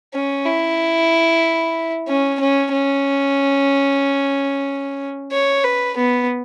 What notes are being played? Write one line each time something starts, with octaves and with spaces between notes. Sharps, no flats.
C#4
E4
C#4
C#4
C#4
C#5
B4
B3